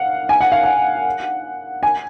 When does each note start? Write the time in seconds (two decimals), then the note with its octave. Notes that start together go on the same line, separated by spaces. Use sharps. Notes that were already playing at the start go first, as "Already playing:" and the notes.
Already playing: F5 F#5
0.29 G#5
0.41 F#5
0.52 F5
0.63 F#5
1.83 G#5